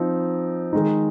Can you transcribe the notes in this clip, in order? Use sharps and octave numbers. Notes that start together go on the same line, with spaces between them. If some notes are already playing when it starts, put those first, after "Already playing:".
Already playing: F3 C4 D#4
D#3 G#3 D#4